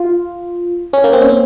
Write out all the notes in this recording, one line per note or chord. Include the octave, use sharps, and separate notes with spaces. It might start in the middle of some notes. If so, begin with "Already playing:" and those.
Already playing: F4
C#4
A#3
C4
C#4
C4